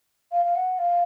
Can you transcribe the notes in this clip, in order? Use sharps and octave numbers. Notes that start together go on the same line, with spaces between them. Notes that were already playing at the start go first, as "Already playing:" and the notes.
F5
F5
F#5
F5